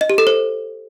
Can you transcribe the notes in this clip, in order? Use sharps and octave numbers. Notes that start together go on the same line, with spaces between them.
D#5
G4
A4
C5